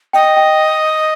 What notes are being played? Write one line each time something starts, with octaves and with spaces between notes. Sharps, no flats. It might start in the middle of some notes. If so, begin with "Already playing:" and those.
D#5 G5
G5